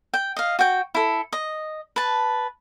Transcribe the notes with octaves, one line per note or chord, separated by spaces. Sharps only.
G5
D#5 F5
F#4 G5
E4 A4
D#5
B4 A5